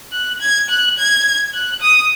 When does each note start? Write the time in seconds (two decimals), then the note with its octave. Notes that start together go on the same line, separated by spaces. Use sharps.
0.12 F#6
0.41 G#6
0.69 F#6
0.97 G#6
1.54 F#6
1.81 D#6